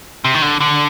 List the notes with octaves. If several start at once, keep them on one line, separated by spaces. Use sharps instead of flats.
C3
D#3
D3
D3